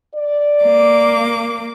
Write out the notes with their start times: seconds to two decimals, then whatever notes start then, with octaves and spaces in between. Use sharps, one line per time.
0.15 D5
0.64 A#3 D6